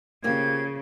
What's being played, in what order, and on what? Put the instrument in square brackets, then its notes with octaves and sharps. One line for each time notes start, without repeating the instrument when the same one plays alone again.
[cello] C#3 [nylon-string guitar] F3 A#3 G4 [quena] G#6